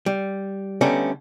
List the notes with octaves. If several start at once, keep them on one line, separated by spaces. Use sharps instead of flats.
G3
D3 G3 A3 B3 C#4 D#4